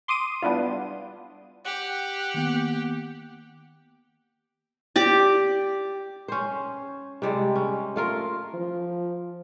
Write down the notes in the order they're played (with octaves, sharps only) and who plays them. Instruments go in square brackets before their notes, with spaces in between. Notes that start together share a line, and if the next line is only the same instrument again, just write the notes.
[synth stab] C6 D6 D#6 D#7
G3 B3 D4 E4 F4
[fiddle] G4 [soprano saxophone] F#5
[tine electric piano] D#3 A#3 B3
[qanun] G4 D5
[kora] C#4 C5
C3 G3 G#3
C#4
A3 F4 A#4
[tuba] F3